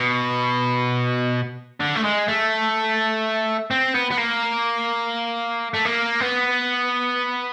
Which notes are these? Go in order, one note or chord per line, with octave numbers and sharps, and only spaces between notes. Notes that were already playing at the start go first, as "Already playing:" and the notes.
Already playing: B2
D3
A3
G#3
A3
C4
B3
B3
A#3
A3
A#3
B3